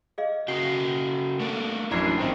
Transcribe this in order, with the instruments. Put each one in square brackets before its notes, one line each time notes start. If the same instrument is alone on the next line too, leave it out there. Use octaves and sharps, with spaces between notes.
[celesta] G#4 D#5 F5
[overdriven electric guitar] C#3 F#4 [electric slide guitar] A4 A#4 G5 [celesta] C7
[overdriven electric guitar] A3 A#3 [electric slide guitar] D4 A4 A#4
[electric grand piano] A#1 F#2 [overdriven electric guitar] E3 [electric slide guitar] D4 [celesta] A#5 G#6 C7
[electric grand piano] A1 C5 G5 [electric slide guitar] A#2 C4 [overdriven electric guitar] D#3